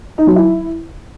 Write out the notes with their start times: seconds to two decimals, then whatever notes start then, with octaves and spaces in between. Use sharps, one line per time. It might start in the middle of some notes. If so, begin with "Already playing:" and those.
0.18 D#4
0.27 F#3
0.36 E4